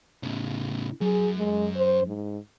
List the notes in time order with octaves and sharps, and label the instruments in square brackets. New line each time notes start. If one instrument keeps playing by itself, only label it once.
[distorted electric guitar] A2 C#3
[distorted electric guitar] F#2 [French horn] G#4
[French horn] G#3
C5
G#2